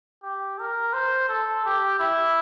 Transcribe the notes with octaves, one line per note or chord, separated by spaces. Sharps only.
G4
A#4
C5
A4
G4
E4